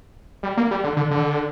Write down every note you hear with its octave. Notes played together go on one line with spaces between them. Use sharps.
G3
A#3
G3
D3
D3
D3